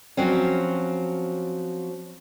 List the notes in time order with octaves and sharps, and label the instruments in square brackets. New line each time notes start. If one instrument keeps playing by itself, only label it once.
[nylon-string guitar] F3 F#3 C4 C#4